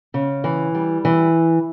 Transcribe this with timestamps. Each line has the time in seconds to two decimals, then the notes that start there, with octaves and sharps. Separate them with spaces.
0.14 C#3
0.44 E3
0.75 G3
1.05 E3